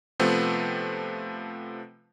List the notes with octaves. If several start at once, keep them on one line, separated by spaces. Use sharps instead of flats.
C3 F3 A3 B3 C4